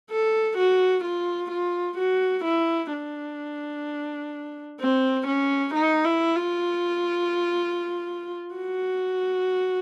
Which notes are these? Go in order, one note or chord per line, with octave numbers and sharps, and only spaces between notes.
A4
F#4
F4
F4
F#4
E4
D4
C4
C#4
D#4
E4
F4
F#4